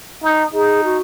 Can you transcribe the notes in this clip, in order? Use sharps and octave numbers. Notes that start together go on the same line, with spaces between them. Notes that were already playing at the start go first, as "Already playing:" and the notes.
D#4
D#4 G#4
F#4